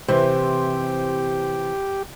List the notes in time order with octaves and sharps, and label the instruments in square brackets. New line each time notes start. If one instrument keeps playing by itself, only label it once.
[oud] C3 E3 [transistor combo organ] G4 [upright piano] C5